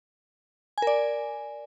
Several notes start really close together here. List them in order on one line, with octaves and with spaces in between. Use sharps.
G#5 A#4 D5